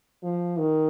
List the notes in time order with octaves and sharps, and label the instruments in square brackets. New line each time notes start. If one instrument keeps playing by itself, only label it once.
[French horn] F3
D#3